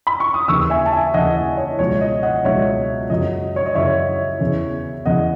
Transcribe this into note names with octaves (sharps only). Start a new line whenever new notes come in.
B5
C#6
D#6
D#2 C#3 E3 C#6 E6
E5 G#5
A5
E5 G#5
D#2 C#3 E3 D#5 F#5
D#5
C#5
C#2 B2 F#3 C#5
D#5
D#5 F#5
C#2 B2 F#3 C#5 E5
F#2 C#3 F#3 D#5
C#5
D#5
F#2 C#3 F#3 C#5 E5
E2 C#3 E3
E2 C#3 E3 D#5 F#5